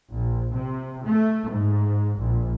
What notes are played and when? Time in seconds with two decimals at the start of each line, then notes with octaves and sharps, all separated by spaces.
0.12 A#1
0.55 C3
1.04 A3
1.50 G#2
2.20 A#1